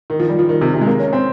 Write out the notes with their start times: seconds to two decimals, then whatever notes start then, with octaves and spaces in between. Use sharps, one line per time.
0.10 D#3
0.20 F3
0.29 G3
0.39 F3
0.49 D#3
0.61 C3
0.74 C3
0.81 G#3
0.87 A#3
1.00 C#4
1.13 C4